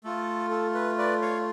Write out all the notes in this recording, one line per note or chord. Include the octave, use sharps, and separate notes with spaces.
A3 F4 A4
A4
B4
B4 D5
C#5 F5